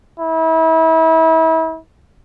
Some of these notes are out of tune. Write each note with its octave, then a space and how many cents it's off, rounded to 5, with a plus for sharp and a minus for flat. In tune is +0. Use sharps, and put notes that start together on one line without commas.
E4 -35